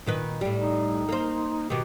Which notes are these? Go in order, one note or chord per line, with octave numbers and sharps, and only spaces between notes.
A#2 D#3 B4
A2 G3
D#4
A#3 C5
B2 D#3 G4